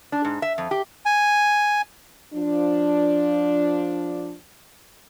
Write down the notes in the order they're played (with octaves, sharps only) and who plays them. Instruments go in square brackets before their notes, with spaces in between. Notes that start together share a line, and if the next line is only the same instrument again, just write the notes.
[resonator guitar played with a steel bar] D4
G#2
E5
F2
G4
[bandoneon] G#5
[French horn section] F3 D4